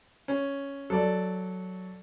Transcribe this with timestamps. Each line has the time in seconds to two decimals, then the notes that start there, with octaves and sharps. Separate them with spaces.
0.28 C#4
0.90 F#3 A4 D5